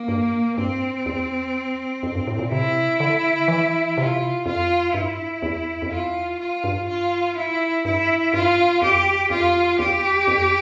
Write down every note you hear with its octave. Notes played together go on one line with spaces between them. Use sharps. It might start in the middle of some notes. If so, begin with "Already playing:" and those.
Already playing: A#3
G2
G2 C4
E2
F2
G2
A2
A#2
C3 E4
D3
E3
C3 F4
F2 F4
G2 E4
E2
F2
E2 F4
F4
G2
F4
E4
G2 E4
G2 F4
F2 G4
F2 F4
E2 G4
F2